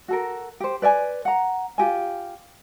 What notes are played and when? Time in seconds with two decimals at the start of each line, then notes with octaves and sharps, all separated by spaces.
0.08 F#4 A4 A#4
0.60 G4 C5
0.82 B4 D5 E5 G#5
1.25 F#5 A#5
1.78 F4 G4 G#5